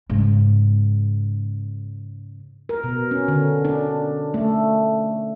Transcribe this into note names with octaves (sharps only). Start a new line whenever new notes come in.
G#2 C#3
A#4
B2
C#4
D3
D4
A3